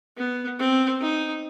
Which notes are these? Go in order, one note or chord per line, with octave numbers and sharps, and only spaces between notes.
B3
C4
D#4